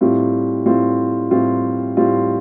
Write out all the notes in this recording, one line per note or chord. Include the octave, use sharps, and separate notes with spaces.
A2 G3 C4 F4
A2 G3 C4 F4
A2 G3 C4 F4
A2 G3 C4 F4